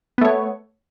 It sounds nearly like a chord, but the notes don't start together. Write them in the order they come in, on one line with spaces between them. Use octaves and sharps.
B3 A3 C#5